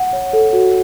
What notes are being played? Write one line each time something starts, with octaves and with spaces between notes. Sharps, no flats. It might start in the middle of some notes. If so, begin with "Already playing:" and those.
Already playing: F#5
C#5
A4
F#4